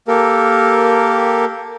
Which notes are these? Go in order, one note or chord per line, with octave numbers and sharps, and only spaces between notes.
A#3 G4 A4 A#4